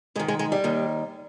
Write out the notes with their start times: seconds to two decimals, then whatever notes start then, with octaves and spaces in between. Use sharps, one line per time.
0.16 G#2 G#3
0.19 D#3
0.28 G#3
0.39 G#3
0.52 G3
0.64 D#2 D#3